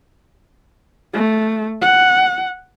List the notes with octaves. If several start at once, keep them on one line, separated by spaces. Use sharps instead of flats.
A3
F#5